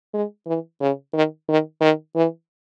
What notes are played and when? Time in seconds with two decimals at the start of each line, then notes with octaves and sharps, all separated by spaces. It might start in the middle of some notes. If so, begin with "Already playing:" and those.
0.14 G#3
0.47 E3
0.81 C#3
1.14 D#3
1.49 D#3
1.81 D#3
2.15 E3